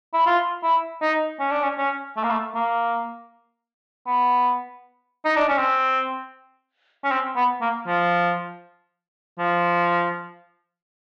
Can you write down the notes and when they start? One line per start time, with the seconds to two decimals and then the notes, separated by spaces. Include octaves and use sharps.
0.14 E4
0.26 F4
0.63 E4
1.02 D#4
1.40 C#4
1.51 D4
1.63 C#4
1.78 C#4
2.17 A3
2.24 A#3
2.30 A3
2.55 A#3
4.07 B3
5.25 D#4
5.36 D4
5.48 C#4
5.58 C4
7.04 C#4
7.12 C4
7.36 B3
7.61 A#3
7.87 F3
9.39 F3